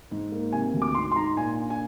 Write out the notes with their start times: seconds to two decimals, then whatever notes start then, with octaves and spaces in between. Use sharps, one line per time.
0.11 G#2
0.32 A#3
0.52 C3 G#5
0.74 D2
0.82 D6
0.95 G#2 C6
1.12 C6
1.16 D#4 A#5
1.37 A#2 G#5
1.58 D4
1.70 G#5